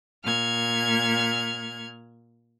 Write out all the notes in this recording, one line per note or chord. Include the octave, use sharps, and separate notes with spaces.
A#2 F6 G#6